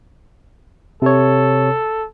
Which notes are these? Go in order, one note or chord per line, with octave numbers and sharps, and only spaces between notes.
C3 A4 C#5